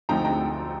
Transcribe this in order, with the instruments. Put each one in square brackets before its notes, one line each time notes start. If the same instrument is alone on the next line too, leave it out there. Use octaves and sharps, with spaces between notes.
[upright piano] D2 D3 F3 C4 D#4 G5 A#5
G5 A#5